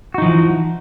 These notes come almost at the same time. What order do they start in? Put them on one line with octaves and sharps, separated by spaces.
F#4 D#4 F3 E3